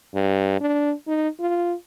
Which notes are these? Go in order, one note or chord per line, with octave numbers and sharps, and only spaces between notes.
G2
D4
D#4
F4